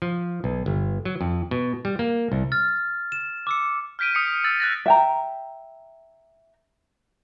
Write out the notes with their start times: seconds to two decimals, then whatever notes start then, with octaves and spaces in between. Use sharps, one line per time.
0.02 F3
0.44 B1
0.66 G1
1.05 F#3
1.21 F2
1.51 B2
1.85 G3
1.99 A#3
2.32 C2
2.52 F6 A6
3.12 E7
3.47 D6 E6 C#7
3.99 F6 G6 B6 D7 D#7
4.15 D#6 B6 C#7
4.31 D#6
4.44 E6 A6
4.60 F#6 A6 A#6
4.86 E5 G5 A#5